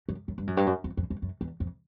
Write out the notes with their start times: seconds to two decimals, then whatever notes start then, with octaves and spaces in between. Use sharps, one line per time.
0.09 F#2
0.28 F#2
0.38 G2
0.47 F#2
0.57 G2
0.66 F#2
0.84 F2
0.97 F2
1.10 F2
1.22 F#2
1.41 E2
1.60 F2